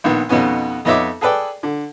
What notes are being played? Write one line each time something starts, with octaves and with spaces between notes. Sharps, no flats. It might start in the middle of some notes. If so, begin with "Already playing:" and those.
A#1 D#3 B3
F2 B2 D#3 B3 C#4
F2 B3 D#4 C#5 E5 D6
G#4 A4 B4 D5 G5
D3